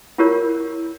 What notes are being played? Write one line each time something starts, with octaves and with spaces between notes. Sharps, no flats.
E4 F4 G4 A#4 C#5